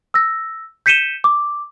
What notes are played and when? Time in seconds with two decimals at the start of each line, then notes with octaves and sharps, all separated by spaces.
0.14 E6 A#6
0.86 G6 B6 C#7 D#7 E7 G7
1.24 D6